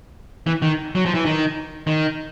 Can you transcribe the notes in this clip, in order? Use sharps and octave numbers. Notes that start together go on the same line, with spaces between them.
E3
D#3
F#3
F3
E3
D#3
D#3